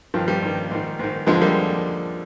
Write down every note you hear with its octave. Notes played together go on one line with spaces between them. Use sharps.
G2 D#3 F3
G3
G2 D#3
G#2 D#3
G#2 D#3
F2 D3 F3 G#3
G3 A#3